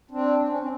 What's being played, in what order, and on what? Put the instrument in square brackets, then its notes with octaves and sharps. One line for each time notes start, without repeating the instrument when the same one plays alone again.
[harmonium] C4 D4
D4
C#4
C4